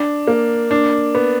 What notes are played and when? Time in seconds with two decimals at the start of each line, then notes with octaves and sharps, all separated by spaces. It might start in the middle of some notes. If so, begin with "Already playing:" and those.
Already playing: D4
0.27 A#3
0.71 D4
1.15 B3